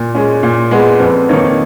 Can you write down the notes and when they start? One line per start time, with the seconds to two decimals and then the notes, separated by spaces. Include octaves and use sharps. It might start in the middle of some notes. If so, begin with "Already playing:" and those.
Already playing: A#2
0.15 G#3 C#4
0.43 A#2
0.71 G#3 B3
1.00 F2 B4
1.29 D#3 A#3 D#4 C#5